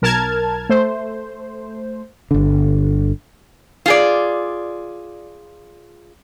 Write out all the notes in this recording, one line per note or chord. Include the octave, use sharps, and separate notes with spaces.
B1 A#4 A5 F6 G#6
A3 C5
G1 D3
F4 G#4 D5